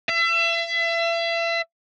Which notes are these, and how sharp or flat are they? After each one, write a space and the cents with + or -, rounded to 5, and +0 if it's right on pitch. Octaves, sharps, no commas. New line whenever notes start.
E5 +35